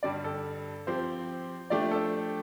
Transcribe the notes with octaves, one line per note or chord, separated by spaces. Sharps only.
G2 D3 G3 D5
A4
F3 C4 G4 C5
F3 A3 D4 G4 D5
A4